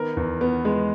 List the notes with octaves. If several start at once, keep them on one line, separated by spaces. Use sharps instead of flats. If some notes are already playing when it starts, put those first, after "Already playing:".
Already playing: D#3 B3 A#4
E2
B3
G#3